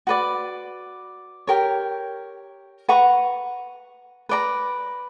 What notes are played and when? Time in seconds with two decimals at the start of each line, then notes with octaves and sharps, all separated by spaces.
0.07 F#4 B4 D5
1.47 G4 A#4 C#5
2.89 B4 F#5 A#5 C#6
4.29 B4 D5 A#5